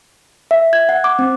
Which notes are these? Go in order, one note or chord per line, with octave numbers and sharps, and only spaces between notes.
E5
G#6
F#5
D6
C4